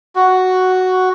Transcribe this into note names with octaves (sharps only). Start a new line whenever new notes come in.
F#4